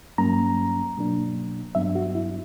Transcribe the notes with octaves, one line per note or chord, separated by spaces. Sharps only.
G2 F#3 A#3 C#4 A#5
B2 F#3 A#3 D4
G2 F#3 B3 D4 E5
F#4
E4